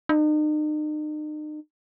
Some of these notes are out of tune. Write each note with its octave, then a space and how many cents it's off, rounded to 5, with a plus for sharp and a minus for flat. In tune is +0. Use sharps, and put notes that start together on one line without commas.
D#4 -40